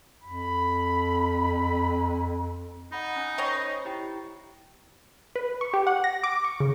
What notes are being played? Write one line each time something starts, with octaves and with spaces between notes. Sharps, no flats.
F2 B5
D#4 D#5 F#5 B5
C#4 G#5
D#3 C5 C#5 D#5 B5 C7
E4 G4 G5
B4
C#6
G4
F#5
A#6
D6
C#6
C#3